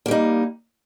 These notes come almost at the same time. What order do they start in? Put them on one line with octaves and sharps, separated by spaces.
A#3 G3 D#4